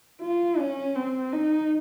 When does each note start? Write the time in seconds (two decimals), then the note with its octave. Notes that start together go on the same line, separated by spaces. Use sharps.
0.21 F4
0.58 C#4
0.96 C4
1.33 D#4